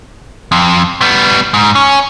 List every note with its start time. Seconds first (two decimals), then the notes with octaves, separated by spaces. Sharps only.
0.52 F2
1.01 G3 B3
1.54 G#2
1.75 C#4